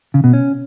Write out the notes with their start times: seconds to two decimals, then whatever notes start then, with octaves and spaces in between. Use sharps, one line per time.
0.14 C#3
0.24 B2
0.33 C#4